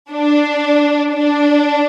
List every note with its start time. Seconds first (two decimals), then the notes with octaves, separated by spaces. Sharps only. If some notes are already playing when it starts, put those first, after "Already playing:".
0.12 D4
1.13 D4